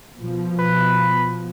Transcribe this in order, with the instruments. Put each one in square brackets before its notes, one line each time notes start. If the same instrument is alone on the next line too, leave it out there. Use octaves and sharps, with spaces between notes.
[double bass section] B2 F3
[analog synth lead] B4